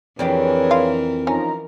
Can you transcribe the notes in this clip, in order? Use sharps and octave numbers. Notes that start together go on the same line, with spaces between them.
F2 E3 D4 G4 G#4 A#4 B4 C#5
F4
F3 C#4 D#4 A#5